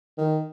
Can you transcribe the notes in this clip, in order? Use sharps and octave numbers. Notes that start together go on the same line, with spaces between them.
D#3